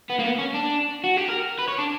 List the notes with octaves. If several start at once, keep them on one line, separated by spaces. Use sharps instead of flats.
B3
A#3
B3
C#4
D4
F#4
G4
A#4
B4
C#5
D4